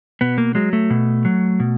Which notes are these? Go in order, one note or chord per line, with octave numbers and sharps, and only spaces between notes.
B2 B3
A#3
F#3 G#3
A3
B2
F#3
B2